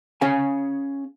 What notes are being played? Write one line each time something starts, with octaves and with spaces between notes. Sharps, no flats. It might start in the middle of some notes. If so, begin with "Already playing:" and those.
C#4 G#4 F5 G#5